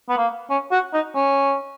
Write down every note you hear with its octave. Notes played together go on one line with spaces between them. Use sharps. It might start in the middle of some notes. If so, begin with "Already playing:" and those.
B3
A#3
C#4
F#4
D#4
C#4